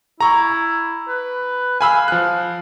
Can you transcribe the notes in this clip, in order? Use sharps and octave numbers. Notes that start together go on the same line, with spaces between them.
E4 A#5 C#6
B4
F5 G#5 B5 E6
F3 F#6